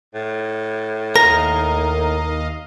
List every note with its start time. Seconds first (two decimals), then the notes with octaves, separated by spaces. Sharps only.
0.14 A2
1.16 D#2 A#4 D#5 F5 A#6